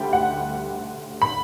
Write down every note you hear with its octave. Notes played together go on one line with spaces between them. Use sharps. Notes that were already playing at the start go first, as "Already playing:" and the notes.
Already playing: D2 D3 G3 D4 G5 B5
F#5
B5